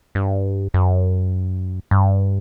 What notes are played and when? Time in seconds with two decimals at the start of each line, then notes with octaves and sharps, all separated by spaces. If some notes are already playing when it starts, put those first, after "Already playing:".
0.15 G2
0.74 F#2
1.91 G2